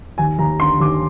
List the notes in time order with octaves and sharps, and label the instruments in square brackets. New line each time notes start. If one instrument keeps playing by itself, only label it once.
[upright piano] D#2 G#5
D#2 A#5
D3 C6
D#2 D6